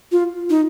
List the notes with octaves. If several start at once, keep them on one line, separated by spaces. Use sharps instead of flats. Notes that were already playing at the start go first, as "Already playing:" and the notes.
F4
D#4